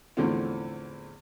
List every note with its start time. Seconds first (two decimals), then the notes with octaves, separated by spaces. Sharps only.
0.17 E2 A2 D3 F3 C4